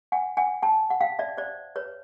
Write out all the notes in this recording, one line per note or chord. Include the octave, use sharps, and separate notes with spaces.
F#5 G#5
F#5 G#5
G5 A5
F#5
F5 G5
D5 E5
C5 D5
B4 C#5